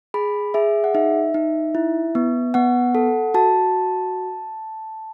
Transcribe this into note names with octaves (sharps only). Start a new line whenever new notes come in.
G#4 B5
G#4 E5
F#5
D#4 E5
D#4
E4
B3
B3 F#5
A4
F#4 A5